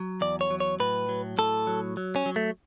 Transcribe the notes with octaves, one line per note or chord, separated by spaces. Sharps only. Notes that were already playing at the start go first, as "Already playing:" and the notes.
Already playing: F#3
E2 D5
C#5
F#3
C#5
A2 B4
F#3
A2 A4
F#3
F#3
C#4
F#3
A3